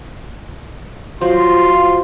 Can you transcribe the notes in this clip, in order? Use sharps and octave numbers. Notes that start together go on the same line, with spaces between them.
F#3 F4 C5 C6